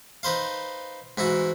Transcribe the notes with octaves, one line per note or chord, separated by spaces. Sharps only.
D#4 B4 C5 F5
G#2 E3 E4 F#4